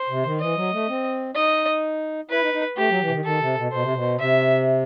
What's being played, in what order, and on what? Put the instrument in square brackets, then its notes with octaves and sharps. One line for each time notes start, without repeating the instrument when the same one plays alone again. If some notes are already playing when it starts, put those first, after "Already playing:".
Already playing: [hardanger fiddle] C5
[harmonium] C3
D#3
[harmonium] E3 [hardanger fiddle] D#5
[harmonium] F#3
A3
C4
[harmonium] D#4 [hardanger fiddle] D#5
[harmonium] E4 [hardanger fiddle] B4
[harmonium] D#4
D#4
[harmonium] A3 [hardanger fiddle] G4
[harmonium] F#3
E3
C3
D#3
[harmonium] D#3 [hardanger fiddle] A4
[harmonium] C3
B2
[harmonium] B2 [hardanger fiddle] C5
[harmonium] C3
B2
[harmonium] C3 [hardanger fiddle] E5